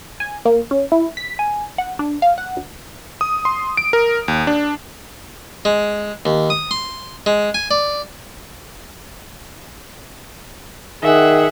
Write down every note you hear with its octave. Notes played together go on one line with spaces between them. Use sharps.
G#5
A#3
C#4
E4
B6
G#5
F#5
D4
F5
F#5
D2
D#6
C6
D7
A#4
D#2
D4
G#3
D#2
D#6
C6
G#3
G#5
D5
D#3 G#4 E5 F#5